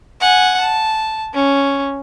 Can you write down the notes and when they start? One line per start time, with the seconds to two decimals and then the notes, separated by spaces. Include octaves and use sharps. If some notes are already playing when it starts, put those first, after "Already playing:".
0.21 F#5 G#5
0.61 A5
1.34 C#4